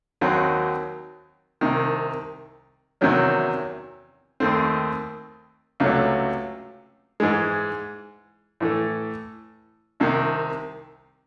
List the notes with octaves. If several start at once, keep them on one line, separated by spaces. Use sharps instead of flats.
D#2 D#3 F#3 C4
C2 C3 D#3
E2 C3 D#3 F#3 C#4
D#2 D#3 A3 C4
C#2 C3 F#3 A3 C#4
G#2 E3 G#3
A2 E3 A3
C2 C3 D#3